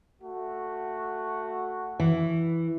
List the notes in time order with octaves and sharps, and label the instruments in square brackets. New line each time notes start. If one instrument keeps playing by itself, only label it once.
[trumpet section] A3 F#4
[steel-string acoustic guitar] E3